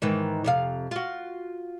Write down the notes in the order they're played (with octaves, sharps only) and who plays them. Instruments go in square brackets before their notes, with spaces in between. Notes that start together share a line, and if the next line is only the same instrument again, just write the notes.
[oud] G#2 D#3 E3
F2 C3 F5
F4 F#4